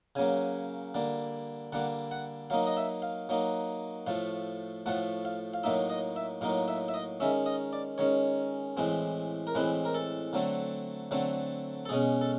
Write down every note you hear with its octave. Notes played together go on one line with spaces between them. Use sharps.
C#3 F#3 A#3 G#5
D3 G3 A#3
D3 G3 A#3 F#5
F#5
F#3 A#3 D#4 F5
D#5
E5
F5
F#3 A#3 D#4
A2 F3 A3 F5
A2 F3 A3 F#5
F5
F5
A2 F#3 A#3 D#4 E5
D#5
E5
A2 F#3 A#3 D#4 F5
E5
E5
D#5
D#3 G#3 C#4 E5
D#5
D5
D#3 G#3 C#4 C#5
A2 E3 G#3 C4
A#4
A2 E3 G#3 C4 B4
A#4
A4
D3 F#3 A3 C4
D3 F#3 A3 C4
A4
B2 G#3 C#4 G#4
A4